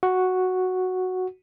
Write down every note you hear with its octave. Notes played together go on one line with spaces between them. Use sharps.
F#4